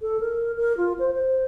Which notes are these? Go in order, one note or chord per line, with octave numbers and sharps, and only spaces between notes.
A4
A#4
A#4
F4
C5
C5